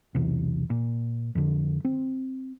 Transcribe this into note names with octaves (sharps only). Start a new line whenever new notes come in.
B1 E2 C3
A#2
F2 D3
C4